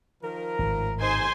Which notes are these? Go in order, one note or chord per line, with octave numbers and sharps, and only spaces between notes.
D#3 F3 A#4
G#1 A2
C3 D#4 C5 G#5 C6